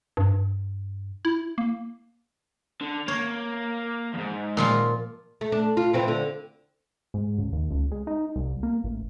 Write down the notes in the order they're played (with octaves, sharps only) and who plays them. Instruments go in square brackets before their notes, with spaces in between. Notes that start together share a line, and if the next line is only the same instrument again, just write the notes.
[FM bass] G2
E4
A#3
[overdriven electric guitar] D3
[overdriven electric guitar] A#3 [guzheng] C#5
[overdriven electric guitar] E2 G#2
[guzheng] A#2 F3 F4
[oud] A3
D4
F4
E3 C4 E4
D3
[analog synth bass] G#2
C#2
D#2
C#2
G#3
D#4
C2
A#3
A1